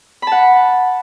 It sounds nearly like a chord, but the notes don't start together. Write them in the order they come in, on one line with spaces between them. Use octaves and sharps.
B5 A5 F#5